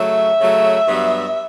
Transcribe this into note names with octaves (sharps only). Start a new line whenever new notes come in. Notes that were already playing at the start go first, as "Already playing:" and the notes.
Already playing: C#3 F#3 A3 E5
C#3 F#3 A3
G2 F#3 B3